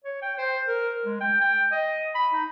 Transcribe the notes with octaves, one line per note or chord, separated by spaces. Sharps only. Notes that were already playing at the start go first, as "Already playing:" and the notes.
C#5
G5
C5
A#4
G#3
G5
G5
D#5
B5
D#4